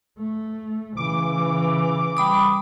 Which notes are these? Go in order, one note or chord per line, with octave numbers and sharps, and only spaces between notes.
A3
C#3 E3 D6
G3 B5 D#6